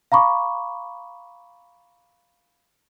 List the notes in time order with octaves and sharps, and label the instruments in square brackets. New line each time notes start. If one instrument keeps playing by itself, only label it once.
[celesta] F5 A#5 B5 C#6 D6